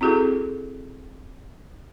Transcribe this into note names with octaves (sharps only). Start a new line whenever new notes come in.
C4 E4 F#4 G#4 A4